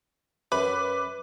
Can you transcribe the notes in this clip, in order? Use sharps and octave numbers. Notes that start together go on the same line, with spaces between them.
F#2 B4 B5 D6